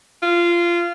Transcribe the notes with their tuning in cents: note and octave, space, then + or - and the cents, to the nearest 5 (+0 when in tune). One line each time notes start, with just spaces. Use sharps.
F4 -15